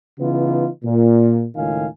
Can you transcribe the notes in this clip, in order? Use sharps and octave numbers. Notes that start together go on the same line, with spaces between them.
C#3 E3 B3 D#4 F4
A#2
C#2 A2 D#3 F4 F5 G#5